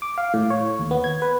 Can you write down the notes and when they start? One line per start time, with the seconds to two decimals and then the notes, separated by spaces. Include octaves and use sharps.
0.02 D6
0.18 F5
0.34 A2
0.50 C#5
0.79 D#2
0.91 B3
1.04 G#6
1.22 B4